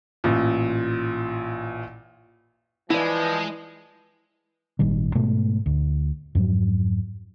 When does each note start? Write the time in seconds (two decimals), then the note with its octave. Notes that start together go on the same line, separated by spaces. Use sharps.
0.24 A1 A#2
2.90 E3 F3 G#3 E4 D5
4.79 G#1 A#2 D#3 G3
5.15 G#2 B2 G#3 A3
5.66 D2
6.35 F2 G#2 F#3